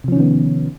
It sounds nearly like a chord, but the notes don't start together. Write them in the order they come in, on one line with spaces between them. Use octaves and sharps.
C3 F3 C#4 D#3 B3